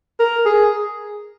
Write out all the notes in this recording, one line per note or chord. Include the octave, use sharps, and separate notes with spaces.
A#4
G#4